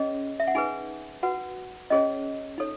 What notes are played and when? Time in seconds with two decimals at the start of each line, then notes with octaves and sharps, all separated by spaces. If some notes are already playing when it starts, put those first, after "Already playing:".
Already playing: C#4 G#4 C#5 D#5
0.40 E5
0.47 F#5
0.55 D#4 G#4 B4 G#5
1.23 F#4 B4 F#5
1.90 C#4 G#4 C#5 D#5
2.58 D#4 A4 C#5